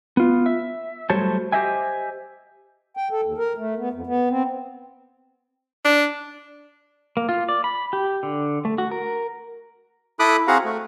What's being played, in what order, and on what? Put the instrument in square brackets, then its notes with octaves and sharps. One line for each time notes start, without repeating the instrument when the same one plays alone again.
[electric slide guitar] B3 F4
E5
F#3 G3 A3 C5 C#5 A5
G4 C5 D#5 E5 G#5
[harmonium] G5
A4
D#2
A#4
A3
B3
F2
B3
C4
[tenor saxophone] D4
[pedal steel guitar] A#3
F4
D5
B5
G4
D3
A3
F#4
A#4
[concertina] E4 A4 B5 D6 D#6 F#6
C4 F#4 G#4 F5 F#5 A#5
A3